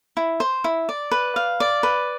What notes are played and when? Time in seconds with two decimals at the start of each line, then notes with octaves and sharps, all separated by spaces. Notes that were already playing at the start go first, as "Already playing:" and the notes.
0.17 E4
0.40 C5
0.64 E4
0.89 D5
1.11 B4
1.36 F5
1.60 D5
1.83 B4